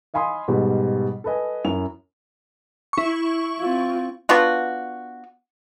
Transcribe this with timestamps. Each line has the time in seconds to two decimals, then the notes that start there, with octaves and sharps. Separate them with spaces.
0.14 D#5 F5 G#5 B5 C6 D#6
0.48 G#2 B2 G3
1.24 A4 B4 D#5 G#5
1.65 F#2 E4 F7
2.93 E4 C#6
3.60 C4 F4
4.29 B3 D4 F4 F#4